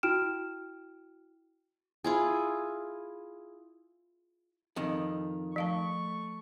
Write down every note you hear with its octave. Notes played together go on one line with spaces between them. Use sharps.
E4 F#4 G5 F6 D7 E7
E4 F4 G#4
F2 D#3
F3 A3 F5 A5 C#6